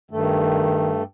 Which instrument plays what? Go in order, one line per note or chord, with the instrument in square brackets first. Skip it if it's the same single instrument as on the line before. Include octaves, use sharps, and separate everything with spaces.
[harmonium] G2 A3 [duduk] D#3